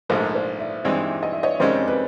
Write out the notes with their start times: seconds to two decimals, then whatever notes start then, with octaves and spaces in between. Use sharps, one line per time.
0.09 A#1 G#2 F3 A3 A#4 C5
0.34 C5 D5
0.60 D5 E5
0.85 G2 E3 G#3 C4 D#4 D5 E5
1.22 D#5
1.33 E5
1.43 C#5 D#5
1.60 F2 C3 D#3 G#3 C#4 C5 D5
1.88 B4